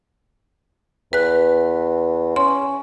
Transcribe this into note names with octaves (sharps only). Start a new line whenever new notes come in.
E2 B4 F#6
C#4 C6